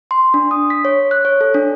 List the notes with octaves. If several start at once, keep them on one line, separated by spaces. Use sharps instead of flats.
C6
D4
D#6
B6
C#5
F#6
C#5
A4
D4